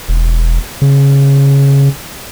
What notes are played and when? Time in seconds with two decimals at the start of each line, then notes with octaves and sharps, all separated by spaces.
0.09 E1
0.82 C#3